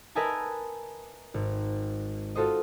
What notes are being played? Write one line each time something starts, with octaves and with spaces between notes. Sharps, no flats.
A#4 B4 D#5 E5 G#5 A5
G#1
F4 F#4 A4 C5 D#5